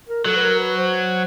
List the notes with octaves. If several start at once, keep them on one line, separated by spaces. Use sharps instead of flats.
A#4
F#3 A4
B4
A#4
B4
C5